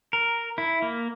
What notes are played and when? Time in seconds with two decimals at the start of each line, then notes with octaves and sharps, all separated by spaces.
0.13 A#4
0.58 E4
0.82 A#3